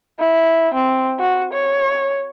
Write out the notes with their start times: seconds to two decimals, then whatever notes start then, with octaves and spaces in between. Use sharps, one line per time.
0.19 E4
0.74 C4
1.20 F#4
1.53 C#5